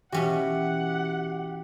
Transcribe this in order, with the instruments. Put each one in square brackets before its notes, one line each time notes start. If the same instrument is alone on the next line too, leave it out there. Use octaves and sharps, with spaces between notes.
[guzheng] B2 C#4 F#4 [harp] E3 [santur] G4 [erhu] F#5